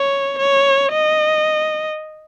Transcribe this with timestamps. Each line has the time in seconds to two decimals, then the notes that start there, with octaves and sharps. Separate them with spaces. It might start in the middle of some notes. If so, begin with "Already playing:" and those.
Already playing: C#5
0.39 C#5
0.93 D#5